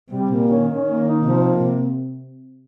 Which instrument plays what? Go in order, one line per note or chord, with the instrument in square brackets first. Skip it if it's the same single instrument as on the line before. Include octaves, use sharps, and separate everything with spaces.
[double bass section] C3 [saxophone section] G3
[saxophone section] A#2
[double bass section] D#3 [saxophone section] C#4
[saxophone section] C#4
A#3
D#4
[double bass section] C3 [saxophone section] F3
[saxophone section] A#3